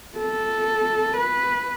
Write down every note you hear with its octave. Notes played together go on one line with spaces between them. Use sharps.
A4
B4